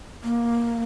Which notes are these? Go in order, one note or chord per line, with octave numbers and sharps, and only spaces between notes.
A#3